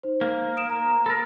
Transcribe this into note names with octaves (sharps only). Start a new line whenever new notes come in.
D#4 C5
A#3
D#6 D7 E7
A#5
A4 A#4 B5